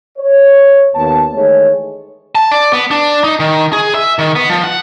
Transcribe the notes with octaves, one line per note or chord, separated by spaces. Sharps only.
C#5
D#2 B3 A5
D#3 E3 G#3 A3 G#4 C#5
A5
D5
B3
D4
D#4
D#3
G#4
E5
D#3
B3
F3
F#5